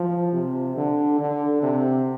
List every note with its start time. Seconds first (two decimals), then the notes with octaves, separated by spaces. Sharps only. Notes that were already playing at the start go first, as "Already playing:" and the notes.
Already playing: F3
0.33 C3
0.77 D3
1.19 D3
1.62 C3